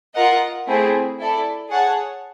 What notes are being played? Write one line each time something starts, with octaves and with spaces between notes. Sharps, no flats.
F4 A#4 D#5 F#5
A3 C4 E4 G#4
E4 A4 D5
G#4 C#5 F#5 A5